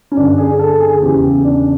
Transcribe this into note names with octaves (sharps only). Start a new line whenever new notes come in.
C#4
G2 D3 D4
G#4
A4
G#4
E2 C#3 E3 G4
D4